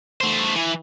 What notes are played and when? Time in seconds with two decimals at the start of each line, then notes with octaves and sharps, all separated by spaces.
0.21 A3 C5
0.56 E3